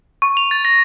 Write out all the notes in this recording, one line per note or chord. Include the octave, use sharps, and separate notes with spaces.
C#6
F7
A6
A#6